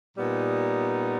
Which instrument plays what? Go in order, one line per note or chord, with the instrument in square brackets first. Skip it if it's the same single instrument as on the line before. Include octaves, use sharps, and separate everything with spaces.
[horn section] A#2 G3 B3 D#4